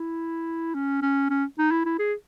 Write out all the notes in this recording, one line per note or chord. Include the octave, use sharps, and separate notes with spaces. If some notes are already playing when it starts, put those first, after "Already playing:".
Already playing: E4
C#4
C#4
C#4
D#4
E4
E4
G#4